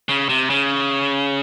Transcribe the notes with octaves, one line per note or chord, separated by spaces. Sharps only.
C#3
C3
C#3